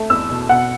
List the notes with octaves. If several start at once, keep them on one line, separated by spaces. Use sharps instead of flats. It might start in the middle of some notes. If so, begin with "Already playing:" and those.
Already playing: A3
E2 E6
B2
B2 F#5